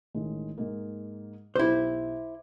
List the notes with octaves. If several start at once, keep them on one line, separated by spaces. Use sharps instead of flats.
A1 D#3 G#3
G#2 G#3 A#3
B1 E4 G4 C5 D6